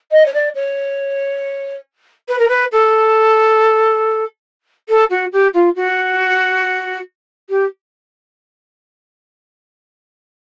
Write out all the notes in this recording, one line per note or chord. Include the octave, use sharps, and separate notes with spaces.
D#5
C#5
D5
C#5
B4
A#4
B4
A4
A4
F#4
G4
F4
F#4
G4